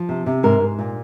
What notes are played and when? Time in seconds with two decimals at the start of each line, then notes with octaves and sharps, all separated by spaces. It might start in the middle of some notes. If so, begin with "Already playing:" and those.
Already playing: F3
0.09 C3
0.26 C3
0.43 G#2 A#4
0.60 G#2
0.79 A#2